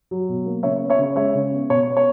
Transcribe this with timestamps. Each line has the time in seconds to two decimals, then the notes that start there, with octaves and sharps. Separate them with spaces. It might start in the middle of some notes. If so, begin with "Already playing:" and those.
0.11 F#3
0.29 B2
0.46 A#3
0.63 C#3 C#5 E5
0.81 B3
0.90 C#5 E5
0.99 C#3
1.16 G#3 C#5 E5
1.35 C#3
1.52 B3
1.70 B2 C#5
1.87 B3
1.97 C#5